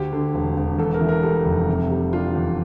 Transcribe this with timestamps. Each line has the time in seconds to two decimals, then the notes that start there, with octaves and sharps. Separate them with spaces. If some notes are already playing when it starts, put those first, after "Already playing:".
Already playing: D2 G4
0.13 D3
0.34 E1
0.57 E1
0.79 E2 A4
0.94 A#4
1.01 E3
1.09 A#4
1.23 G3 A4
1.46 F1
1.68 C3
1.91 G3
2.13 D4 F4
2.35 E2